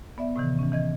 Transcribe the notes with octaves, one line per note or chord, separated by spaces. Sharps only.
B3 D5 E5
A2 C3 D#3 E3
E3 C#4
E3 D#5 G#6